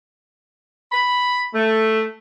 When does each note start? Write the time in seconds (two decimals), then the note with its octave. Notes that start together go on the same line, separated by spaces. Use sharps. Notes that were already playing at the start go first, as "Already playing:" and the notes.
0.92 B5
1.53 A3